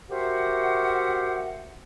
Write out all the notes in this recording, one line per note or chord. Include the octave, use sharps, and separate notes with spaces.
F#4 G4 A#4 C5 E5 F#5